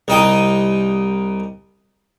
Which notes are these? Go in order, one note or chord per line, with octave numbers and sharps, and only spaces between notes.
C2 D#4 G5 D#6